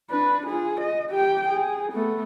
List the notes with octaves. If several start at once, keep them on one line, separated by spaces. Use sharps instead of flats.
D4 B4
F4 G#4
D#5
G4 G5
G#4
A3 B3